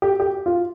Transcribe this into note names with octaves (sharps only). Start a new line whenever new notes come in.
G4
G4
F4